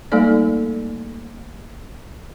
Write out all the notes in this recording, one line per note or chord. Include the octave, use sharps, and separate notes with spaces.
G3 A3 A#3 D#4 A4 D5